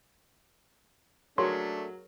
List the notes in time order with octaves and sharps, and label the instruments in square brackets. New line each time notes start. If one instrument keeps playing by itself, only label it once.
[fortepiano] F#3 [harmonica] A3 D4 [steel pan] G#4 A#4 C#5 [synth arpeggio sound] C6